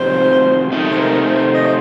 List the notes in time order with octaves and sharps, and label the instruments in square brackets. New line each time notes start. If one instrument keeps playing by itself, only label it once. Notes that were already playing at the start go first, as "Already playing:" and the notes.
Already playing: [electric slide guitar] F2 C3 D#3 F#3 [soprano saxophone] C5
[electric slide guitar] C3 D#3 A3 D#4
[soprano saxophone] C5
A#4
C5
D#5
C5